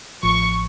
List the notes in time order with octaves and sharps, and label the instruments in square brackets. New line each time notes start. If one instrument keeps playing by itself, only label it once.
[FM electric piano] A1 A2 F3 [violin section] C#6